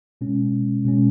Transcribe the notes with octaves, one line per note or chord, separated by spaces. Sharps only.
B2 G#3 C#4
B2 G#3 C#4